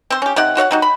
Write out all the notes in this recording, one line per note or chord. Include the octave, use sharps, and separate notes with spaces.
C4 C5
C#4 G4
C3 D#4 D5 F#5
F#4 C#5 F5 F#5
G3 D#4 F#4
B5